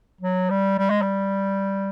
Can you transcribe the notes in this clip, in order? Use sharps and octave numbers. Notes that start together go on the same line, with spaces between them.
F#3
G3
G3
G#3
G3